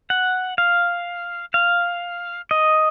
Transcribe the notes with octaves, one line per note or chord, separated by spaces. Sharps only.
F#5
F5
F5
D#5